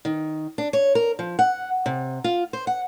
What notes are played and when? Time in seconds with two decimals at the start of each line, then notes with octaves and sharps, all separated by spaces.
0.05 D#3
0.58 D4
0.73 C#5
0.95 A#4
1.19 F3
1.39 F#5
1.86 C3
2.24 F4
2.53 C5
2.67 F#5